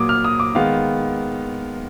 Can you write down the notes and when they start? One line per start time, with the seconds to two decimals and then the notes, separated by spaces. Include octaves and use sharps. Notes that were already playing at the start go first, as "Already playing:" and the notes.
Already playing: A#2 F#3 A#3 D6 D#6
0.09 F6
0.24 D#6
0.40 D6
0.55 D#3 G#3 B3 F5